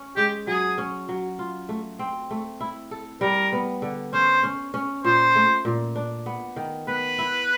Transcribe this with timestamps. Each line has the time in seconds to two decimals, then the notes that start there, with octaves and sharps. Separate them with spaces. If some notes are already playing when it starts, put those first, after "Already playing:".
Already playing: C#4
0.17 G#3 G4
0.47 F#3 G#4
0.78 C#4
1.09 F#3
1.39 F4
1.69 A3
1.99 C4
2.31 A3
2.60 E4
2.91 A4
3.21 G3 A#4
3.53 B3
3.82 D3
4.13 C#4 C5
4.43 C#4
4.74 C#4
5.04 A#2 C5
5.36 A3
5.65 A#2
5.96 D4
6.26 B3
6.56 D#3
6.87 B3 B4
7.18 E4